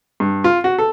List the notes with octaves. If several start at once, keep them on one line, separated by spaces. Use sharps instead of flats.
G2
F4
F#4
A4